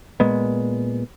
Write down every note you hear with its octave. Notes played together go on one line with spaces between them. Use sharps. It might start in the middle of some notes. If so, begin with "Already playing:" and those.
A#2 G#3 B3